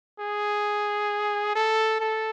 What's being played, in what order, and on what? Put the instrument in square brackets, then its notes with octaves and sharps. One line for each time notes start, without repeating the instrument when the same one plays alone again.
[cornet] G#4
A4
A4